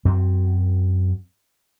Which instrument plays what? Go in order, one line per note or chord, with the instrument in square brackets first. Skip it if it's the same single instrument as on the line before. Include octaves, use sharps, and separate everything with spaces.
[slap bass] F#2 C4